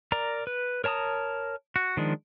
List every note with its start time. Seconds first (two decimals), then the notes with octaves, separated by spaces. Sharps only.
0.12 A#4 D5 A#5
0.47 B4
0.84 A#4 C#5 A5 A#5 D#6
1.76 F#4
1.97 D#3 F3 G#3 D4